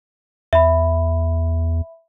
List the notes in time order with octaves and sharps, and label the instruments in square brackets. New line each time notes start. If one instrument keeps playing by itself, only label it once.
[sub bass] E2 [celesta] E5 B5